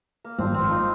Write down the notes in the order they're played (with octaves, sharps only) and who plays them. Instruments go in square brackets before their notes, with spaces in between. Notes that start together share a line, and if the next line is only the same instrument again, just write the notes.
[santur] A#3
[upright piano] G#1 G2 F3 [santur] C4
[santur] C4
F4
D#4